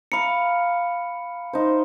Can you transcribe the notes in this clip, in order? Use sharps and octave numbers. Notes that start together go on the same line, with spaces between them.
F5 A#5 B5 C#7
D#4 C5